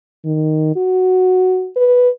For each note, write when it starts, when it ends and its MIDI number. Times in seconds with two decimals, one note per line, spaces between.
0.25 0.71 51
0.76 1.69 66
1.76 2.09 71